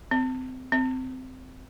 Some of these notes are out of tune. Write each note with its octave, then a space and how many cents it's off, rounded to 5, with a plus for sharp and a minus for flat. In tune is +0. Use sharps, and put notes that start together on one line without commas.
C4 -30
C4 -20